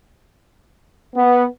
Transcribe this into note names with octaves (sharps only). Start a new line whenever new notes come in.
B3